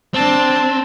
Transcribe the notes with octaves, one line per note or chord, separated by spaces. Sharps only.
C4 D4 A5